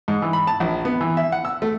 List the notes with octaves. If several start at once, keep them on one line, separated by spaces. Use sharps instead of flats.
G#2
E3
B5
A5
A#1
B3
E3
E5
F#5
E6
A3